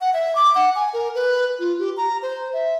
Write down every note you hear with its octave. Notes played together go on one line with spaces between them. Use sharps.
F#5
E5
D6
F#5
G#5
A#4
B4
F4
G4
A#5
C5
E5